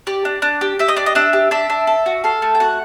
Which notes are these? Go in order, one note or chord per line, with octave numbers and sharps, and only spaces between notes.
G4 D5
D4
D4
G4
G4 E5
D#5
D4 D5
D#5
D4 E5
G4
D4 E5
D4
A4
F#4
A4 F5
A3
G5
F#4 F#5